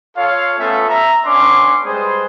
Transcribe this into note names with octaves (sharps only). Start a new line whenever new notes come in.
F4 A4 C#5 F5
A3 B3 C#4 F4 A4 E5
E5 A#5
B3 C#4 D4 C6 D6
G3 G#3 G#4 B4 C5